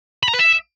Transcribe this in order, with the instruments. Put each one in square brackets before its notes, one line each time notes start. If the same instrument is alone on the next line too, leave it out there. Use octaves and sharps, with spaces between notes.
[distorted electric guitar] B5
A#5
B4
E5